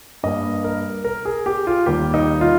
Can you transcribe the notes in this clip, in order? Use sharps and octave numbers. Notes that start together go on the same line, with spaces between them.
G2 G3 A#3 D#5
A#4
A#4
G#4
G4
F4
D#2 D#3 G3 A#3 G4
D#4
F4